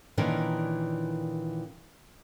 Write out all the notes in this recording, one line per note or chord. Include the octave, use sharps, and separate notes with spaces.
A#2 D#3 E3 C#4 D4 A#4